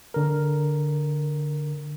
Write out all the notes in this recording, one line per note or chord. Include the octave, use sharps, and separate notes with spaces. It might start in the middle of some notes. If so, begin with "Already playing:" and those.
D3 A#4